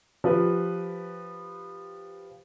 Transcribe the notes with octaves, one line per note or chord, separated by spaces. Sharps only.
F3 G4 B4